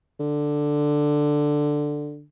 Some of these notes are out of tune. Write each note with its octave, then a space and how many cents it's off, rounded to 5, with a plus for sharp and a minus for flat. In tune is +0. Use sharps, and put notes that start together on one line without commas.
D3 +5